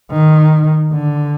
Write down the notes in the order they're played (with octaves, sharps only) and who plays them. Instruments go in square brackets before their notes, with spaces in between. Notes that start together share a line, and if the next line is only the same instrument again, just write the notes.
[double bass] D#3
D3